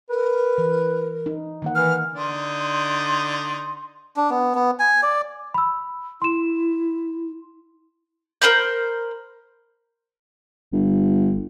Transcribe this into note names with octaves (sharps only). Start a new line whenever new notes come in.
A#4 B4
E3
D#4
D#3 A#3 F#5
E3 F6
D3 D#4 D5 C6
D4
B3
B3
G#5
D5
B5 E6
E4 C6 E7
A#4 C5 B5 G6
G1